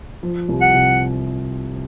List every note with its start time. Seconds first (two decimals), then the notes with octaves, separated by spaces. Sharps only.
0.23 F3
0.49 C2
0.61 F#5
0.74 C3